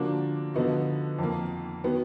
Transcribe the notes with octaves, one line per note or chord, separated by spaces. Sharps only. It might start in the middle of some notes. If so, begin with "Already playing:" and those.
Already playing: D3 F3 A#3 D4 F#4
D3 F3 B3 D#4 F#4
F2 D#3 A#3
D#3 F#3 B3